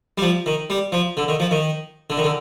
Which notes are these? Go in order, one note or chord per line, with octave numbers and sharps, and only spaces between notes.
G3
F3
D#3
G3
F3
D3
D#3
F3
D#3
D3
D#3
D3